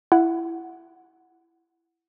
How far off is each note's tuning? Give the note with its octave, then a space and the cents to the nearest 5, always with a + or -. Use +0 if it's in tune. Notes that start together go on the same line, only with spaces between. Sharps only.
E4 +20 F#5 +0